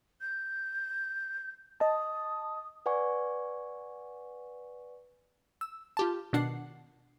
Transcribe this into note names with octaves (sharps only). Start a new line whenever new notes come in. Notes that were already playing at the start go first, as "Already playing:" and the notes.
G6
D#5 A5 D#6
B4 D5 F#5 G#5 C#6
E6
F4 G4 A5
B2 D#3 D4 F#5 C7